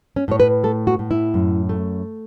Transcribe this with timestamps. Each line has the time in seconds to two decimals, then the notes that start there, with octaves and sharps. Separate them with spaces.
0.16 C#4
0.28 A2 C#5
0.40 B4
0.63 A3 A4
0.87 F#4
0.99 A2
1.11 E4
1.34 F#2
1.69 A3